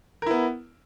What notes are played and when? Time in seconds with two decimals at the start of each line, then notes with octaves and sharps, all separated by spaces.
0.22 A#4
0.26 E4
0.31 B3